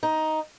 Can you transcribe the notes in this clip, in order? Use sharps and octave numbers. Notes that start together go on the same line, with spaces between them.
D#4